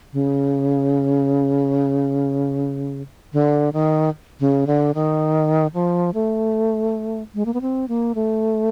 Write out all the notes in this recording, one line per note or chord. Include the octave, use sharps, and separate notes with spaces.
C#3
D3
D#3
C#3
D3
D#3
F3
A3
G#3
A#3
B3
C4
A#3
A3